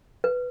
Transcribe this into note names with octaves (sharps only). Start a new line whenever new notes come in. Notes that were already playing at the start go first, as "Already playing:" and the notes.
B4